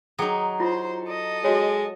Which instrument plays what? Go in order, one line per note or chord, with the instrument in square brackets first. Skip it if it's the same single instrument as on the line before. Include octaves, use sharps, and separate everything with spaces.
[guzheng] F#3 D#4 [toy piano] G#4 G5 D#6
[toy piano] E4 F4 [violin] C5 C6
[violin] A4 D#5
[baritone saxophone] G#3 [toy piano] F#4 C#5